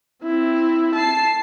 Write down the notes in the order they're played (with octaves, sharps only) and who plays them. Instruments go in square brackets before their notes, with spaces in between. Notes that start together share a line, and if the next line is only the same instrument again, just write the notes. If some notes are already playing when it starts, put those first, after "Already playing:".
[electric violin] C4 E4
A5 C7